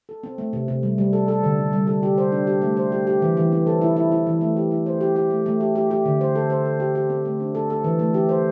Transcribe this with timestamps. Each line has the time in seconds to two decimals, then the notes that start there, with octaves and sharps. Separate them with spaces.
0.09 A4
0.23 C4
0.38 A3
0.53 C3
0.68 C3
0.83 G3
0.98 G3
1.13 A4
1.28 A4
1.43 D3
1.58 D3
1.73 G3
1.87 A4
2.03 G4
2.18 C5
2.32 D4
2.47 G4
2.62 A3
2.77 C5
2.92 G4
3.07 G4
3.22 E3
3.37 E3
3.52 C4
3.67 A4
3.81 E4
3.96 E4
4.12 E4
4.27 E3
4.41 A3
4.57 G4
4.71 E4
4.86 C5
5.01 G4
5.16 G4
5.30 A3
5.46 A3
5.61 G4
5.76 G4
5.91 G4
6.06 D3
6.21 C5
6.35 A4
6.50 C5
6.65 A4
6.80 G4
6.95 G4
7.10 C4
7.25 A3
7.40 D4
7.55 A4
7.70 A4
7.84 E3
7.99 A3
8.14 G4
8.29 C5